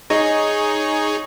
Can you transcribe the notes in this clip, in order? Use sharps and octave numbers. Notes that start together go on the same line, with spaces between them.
D#4 G#4 C#5 D#5